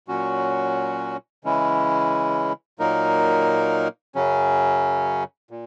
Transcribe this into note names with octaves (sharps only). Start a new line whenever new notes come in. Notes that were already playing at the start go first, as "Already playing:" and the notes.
A#2 F#3 C#4 F#4
C#3 E3 G#3 C#4 E4
A#2 F#3 A#3 D#4 A#4
F#2 C#3 F#3 C#4
A#2